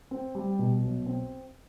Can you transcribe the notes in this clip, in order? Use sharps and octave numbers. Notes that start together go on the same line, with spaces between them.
C4
G3
B2
B1
C4